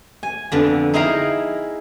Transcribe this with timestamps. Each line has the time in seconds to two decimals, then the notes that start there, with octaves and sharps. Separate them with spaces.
0.23 G#5
0.52 F2 D3 B3
0.94 D#4 E4 G#4 F5 G5 A#5